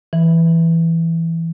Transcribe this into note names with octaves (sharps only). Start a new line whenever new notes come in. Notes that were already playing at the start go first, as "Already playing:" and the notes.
E3